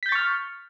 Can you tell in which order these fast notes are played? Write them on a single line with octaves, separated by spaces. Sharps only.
B6 G6 A6 C#6 F6